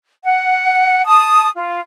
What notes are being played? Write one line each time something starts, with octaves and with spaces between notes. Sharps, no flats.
F#5
A5 D#6
F4